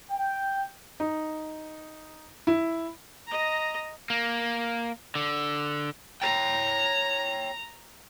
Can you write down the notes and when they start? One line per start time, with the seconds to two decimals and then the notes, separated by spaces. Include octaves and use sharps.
0.11 G5
1.00 D#4
2.47 E4
3.27 D#5 A#5
4.10 A#3
5.15 D3
6.22 C#5 G5 A#5